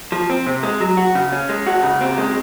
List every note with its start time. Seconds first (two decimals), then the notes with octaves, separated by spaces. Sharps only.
0.12 F3
0.30 C4
0.47 C3
0.63 G#3
0.81 F#3
0.97 F#4
1.15 C#3
1.32 C#4
1.49 G#3
1.67 F#4
1.83 C#3
2.01 C4
2.18 G#3